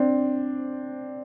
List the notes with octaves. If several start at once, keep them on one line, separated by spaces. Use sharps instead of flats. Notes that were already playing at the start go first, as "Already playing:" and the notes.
Already playing: C4 D4